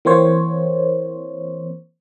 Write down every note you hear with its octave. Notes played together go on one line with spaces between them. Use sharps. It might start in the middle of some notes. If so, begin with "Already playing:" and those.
E3 A#3 C4 C5 C#5